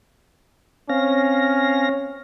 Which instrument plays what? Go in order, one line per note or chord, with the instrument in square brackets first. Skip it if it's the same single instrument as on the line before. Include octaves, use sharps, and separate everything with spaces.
[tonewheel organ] C4 F5 A#6 [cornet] C#4